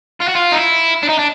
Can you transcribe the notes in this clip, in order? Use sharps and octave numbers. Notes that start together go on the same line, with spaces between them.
F4
F#4
F4
D#4
E4
D4
D#4
D4